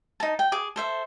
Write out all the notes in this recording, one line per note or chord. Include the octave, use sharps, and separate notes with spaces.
D#4 A5
G5
G#4 D6
A4 C5 E5